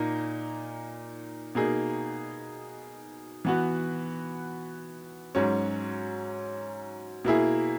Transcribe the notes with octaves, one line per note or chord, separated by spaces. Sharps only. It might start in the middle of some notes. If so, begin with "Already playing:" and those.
Already playing: A#2 A#3 D#4
B2 A#3 D#4 G#4
E3 B3 F#4
G#2 F#3 C#4
B2 A#3 E4 G#4